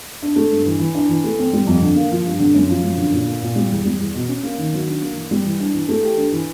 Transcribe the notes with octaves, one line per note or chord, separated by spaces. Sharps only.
D4
A3
G2
E3
E3
D4
E3
A3
C4
G3
F2
D3
A#3
F3
G2
D3
F#2
F3
F#2
D3
A#2
A#3
A#2
G3
E2
G3
E2
B2
C#4
A#3
D#3
F#3
D4
A#3
E3
G3
E3
D4
E3
A3
G4
D4
E3